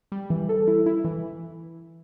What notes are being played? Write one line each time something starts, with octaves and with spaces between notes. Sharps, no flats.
G3
E3
A4
E4
E4
E3